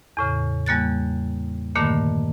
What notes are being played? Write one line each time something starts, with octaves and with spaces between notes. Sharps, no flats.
E2 A2 C#3
E2 G3 A#3 F#6 A6
G2 A#2 D3 D#3 A3 A#3